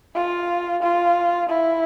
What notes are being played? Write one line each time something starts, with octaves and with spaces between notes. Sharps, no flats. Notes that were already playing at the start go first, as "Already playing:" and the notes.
F4
F4
E4